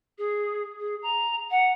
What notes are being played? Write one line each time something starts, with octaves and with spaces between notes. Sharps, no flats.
G#4
G#4
A#5
F#5